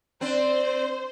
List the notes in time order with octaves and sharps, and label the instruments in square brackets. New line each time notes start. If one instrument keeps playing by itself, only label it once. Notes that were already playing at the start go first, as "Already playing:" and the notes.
[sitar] C4 D4 [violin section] C5